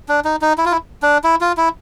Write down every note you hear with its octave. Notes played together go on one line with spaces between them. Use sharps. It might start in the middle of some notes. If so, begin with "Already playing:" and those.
D4
D#4
D#4
E4
F4
E4
D4
E4
F4
E4